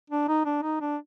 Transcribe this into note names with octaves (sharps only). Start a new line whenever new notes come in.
D4
D#4
D4
D#4
D4